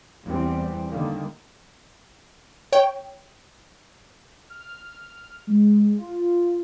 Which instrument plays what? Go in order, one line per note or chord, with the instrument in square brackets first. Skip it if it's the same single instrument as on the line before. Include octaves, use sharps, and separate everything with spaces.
[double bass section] E2 E3 G3 C4
D3 D#3 G3 A#3
[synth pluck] C#5 G5
[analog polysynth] F6
G#3
F4